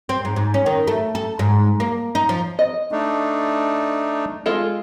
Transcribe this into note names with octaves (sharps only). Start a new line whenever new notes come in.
C4
G#2
G#2
C#4
D#3
A3
A4
G#2
A#3
D#4
F3
D#5
A3 D4 D#4
G#3 F4 A4